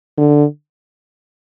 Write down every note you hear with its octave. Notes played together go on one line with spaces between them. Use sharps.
D3